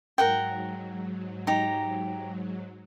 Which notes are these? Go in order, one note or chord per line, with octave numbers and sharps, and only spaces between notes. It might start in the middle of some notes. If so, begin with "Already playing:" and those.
G#2 F#3 A#4 F#5 G5
D#4 G4 A#5